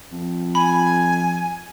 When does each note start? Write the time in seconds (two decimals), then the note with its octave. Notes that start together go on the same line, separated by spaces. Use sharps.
0.12 F2
0.55 G#5 B5